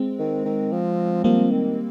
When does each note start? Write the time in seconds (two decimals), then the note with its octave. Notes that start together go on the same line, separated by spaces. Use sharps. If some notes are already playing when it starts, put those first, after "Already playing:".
Already playing: G#3 C4
0.19 D#3
0.46 D#3
0.72 F3
1.24 F3 G3 A#3
1.50 D#3